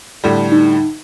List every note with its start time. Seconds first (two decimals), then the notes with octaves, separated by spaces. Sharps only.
0.24 A2 D3 G3
0.52 D#4